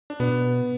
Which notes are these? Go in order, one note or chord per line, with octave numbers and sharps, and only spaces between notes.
D4
B2 B3